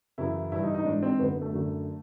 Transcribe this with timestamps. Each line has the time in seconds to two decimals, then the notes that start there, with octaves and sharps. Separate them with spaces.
0.18 F#2 C#3 E3 E4
0.52 G2 E3 E4
0.63 D#4
0.74 D#4
0.85 G#2 E3 D4
1.03 C4
1.19 F#2 D3 B3
1.42 A3
1.53 F#2 D3